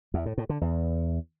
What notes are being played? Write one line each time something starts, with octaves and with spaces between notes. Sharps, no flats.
E2
A2
A2
D3
E2